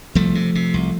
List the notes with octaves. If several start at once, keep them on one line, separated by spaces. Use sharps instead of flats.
C2 F3 A3
C3
C3
C2